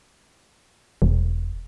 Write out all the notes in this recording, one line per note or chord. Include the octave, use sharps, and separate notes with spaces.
E1